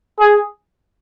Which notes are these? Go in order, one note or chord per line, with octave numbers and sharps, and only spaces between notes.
G#4